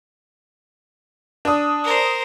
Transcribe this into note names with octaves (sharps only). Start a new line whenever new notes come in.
D4 D#6
A#4 C5